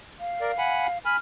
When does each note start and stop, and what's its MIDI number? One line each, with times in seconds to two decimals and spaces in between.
0.20 0.98 77
0.41 0.51 70
0.41 0.51 74
0.58 0.87 78
0.58 0.87 80
0.58 0.87 83
1.05 1.16 80
1.05 1.16 83
1.05 1.17 89